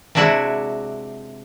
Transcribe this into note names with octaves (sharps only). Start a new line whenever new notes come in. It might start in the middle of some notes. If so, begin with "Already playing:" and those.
C3 G#3 D4 E4 F#4 F#5